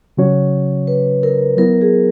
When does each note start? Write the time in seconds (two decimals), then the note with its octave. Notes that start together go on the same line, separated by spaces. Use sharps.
0.17 C#3 F#3 C#4 F#4 C#5
0.87 B4
1.23 A#4
1.57 F#3 B3 E4 A#4
1.81 G#4